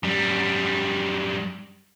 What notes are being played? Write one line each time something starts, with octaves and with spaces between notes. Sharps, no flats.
F#2 G3